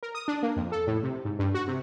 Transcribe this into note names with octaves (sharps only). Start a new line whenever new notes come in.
A#4
D#6
D4
A#3
F2
A4
A2
C3
G#2
G2
F#4
C3